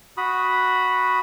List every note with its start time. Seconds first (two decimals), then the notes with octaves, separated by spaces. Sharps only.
0.17 F#4 B5 D#6